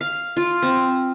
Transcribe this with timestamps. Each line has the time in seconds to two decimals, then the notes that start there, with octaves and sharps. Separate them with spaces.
0.01 F5
0.36 F4
0.62 C4